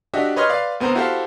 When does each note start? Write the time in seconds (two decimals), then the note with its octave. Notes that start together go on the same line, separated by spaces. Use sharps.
0.14 D4 F#4 G4 D#5 E5
0.36 B4 C#5 D#5 C6 F6
0.49 B4 D5 F5 C6
0.80 D2 B3 C4 C5 A#5
0.95 E4 F#4 G4 A4 C5 F5